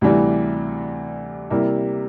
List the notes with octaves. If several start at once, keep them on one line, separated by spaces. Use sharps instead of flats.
D2 C3 E3 G3
C3 G3 A#3 E4